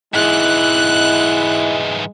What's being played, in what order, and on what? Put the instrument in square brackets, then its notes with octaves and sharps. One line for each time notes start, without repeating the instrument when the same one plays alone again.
[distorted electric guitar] G#2 E3 [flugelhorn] G#3 [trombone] E4 [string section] F#6